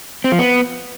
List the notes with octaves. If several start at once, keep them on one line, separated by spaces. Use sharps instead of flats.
C4
F3
B3